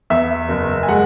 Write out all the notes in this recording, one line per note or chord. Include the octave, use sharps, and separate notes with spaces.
E2 E5
F#1
G#5
G#3 F#5